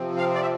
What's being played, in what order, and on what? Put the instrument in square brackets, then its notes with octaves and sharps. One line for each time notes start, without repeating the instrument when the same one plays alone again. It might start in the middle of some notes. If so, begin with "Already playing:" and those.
Already playing: [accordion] C3 F3 C4
F5
D5
E5